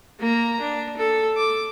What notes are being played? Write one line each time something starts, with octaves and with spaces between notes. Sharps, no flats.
A#3 A#5
D4
A4
D6